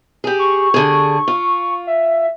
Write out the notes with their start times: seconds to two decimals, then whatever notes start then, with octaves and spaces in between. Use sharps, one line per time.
0.24 G4 G#4
0.39 C#6
0.74 D3 G#4
1.28 F4
1.87 E5